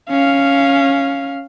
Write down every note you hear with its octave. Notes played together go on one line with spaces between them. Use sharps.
C#4 F5